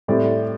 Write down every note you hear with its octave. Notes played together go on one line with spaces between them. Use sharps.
A2 G3 C4 G4 D5